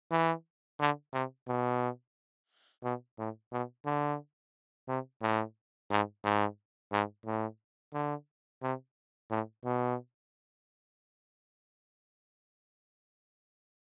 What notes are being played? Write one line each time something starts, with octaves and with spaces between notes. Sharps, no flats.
E3
D3
C3
B2
B2
A2
B2
D3
C3
A2
G#2
G#2
G#2
A2
D3
C3
A2
B2